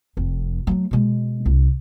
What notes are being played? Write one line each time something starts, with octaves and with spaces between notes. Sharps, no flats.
F1 F2
F#3 A3
B2 G#3
C2